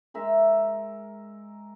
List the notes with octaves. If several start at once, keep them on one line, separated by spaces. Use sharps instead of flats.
G#3 A#4 E5